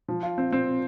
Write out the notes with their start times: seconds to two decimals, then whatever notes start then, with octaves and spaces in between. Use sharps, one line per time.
0.08 F3
0.23 F4
0.38 C4
0.52 C4